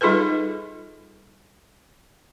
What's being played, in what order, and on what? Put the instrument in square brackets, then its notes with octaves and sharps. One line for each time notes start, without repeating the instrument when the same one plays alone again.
[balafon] G3 D#4 F4 G#4 A4 B4